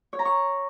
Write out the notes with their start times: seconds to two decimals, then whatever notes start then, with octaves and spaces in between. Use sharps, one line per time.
0.13 C#5
0.19 A#5
0.25 C#6